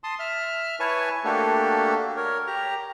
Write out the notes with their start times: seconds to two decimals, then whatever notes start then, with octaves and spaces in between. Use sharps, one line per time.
0.04 A5 C6 D#6
0.19 E5 F6
0.80 E4 B4 C#5 G#5 A5 C#6
1.25 A3 A#3 D4 F#4 G4 A4
2.17 A#4 C#5
2.47 G4 A#5